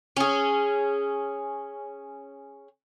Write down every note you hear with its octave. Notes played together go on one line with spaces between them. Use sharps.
C#4 G#4